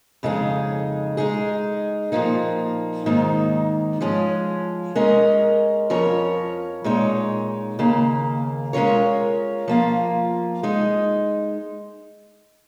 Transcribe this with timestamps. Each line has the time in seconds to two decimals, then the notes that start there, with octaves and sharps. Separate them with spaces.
0.23 F2 C#3 G#3 D#4 G#4
1.17 G#3 D#4 G#4
2.12 A#2 F3 A#3 D#4
3.06 G#2 D#3 A#3 D#4
4.01 F3 G#3 C#4
4.95 G#3 C#4 A#4 D#5
5.90 F2 F3 C#4 A#4 C#5
6.84 A#2 G#3 D#4 C#5
7.79 D#2 C#3 A#3
8.73 G#3 C#4 F4 A#4 C#5
9.68 F3 A#3 F4
10.63 G#3 D#4